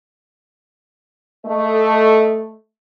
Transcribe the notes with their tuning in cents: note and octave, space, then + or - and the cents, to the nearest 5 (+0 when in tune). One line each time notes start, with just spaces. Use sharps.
A3 +0 D#5 +0